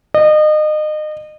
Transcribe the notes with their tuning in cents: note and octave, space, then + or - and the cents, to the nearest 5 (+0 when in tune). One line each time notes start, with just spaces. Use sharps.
D#5 -30